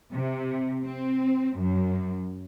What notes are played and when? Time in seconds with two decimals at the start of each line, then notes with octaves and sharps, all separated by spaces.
0.12 C3
0.85 C4
1.59 F#2